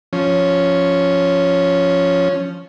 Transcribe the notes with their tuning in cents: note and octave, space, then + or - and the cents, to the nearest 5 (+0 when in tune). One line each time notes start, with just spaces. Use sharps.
F3 +0 C#4 +0